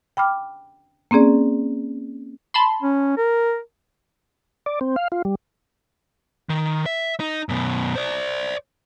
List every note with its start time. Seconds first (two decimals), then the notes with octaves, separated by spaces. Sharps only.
0.17 G5 B5 D6 F6
1.11 A#3 C4 C#4 G#4 D5
2.54 A5 B5 C6
2.82 C#4
3.17 A#4
4.66 D5
4.81 C4
4.96 F5
5.12 F4
5.25 G3
6.49 D#3
6.86 E5
7.20 D#4
7.49 F#2 B2
7.95 C5 D5